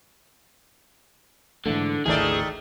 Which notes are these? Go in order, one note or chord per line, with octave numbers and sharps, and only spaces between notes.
G#2 D3 E3 A3
G#1 D2 D#3 E3 A3 G#4 D5